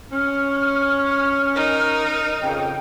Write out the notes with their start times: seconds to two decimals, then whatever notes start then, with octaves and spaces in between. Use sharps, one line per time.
0.12 C#4 F6
1.55 D#4 A#4
2.42 F2 C#3 G5